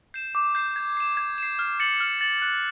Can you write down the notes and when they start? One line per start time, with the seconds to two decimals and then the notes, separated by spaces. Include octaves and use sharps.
0.14 G6 C7 E7
0.35 D6
0.55 G6 C7 E7
0.76 G#6
0.97 C7 E7
1.17 G#6
1.38 C7 E7
1.59 F6
1.80 A6 C#7 F#7
2.00 F6
2.21 A6 C#7 F#7
2.42 F#6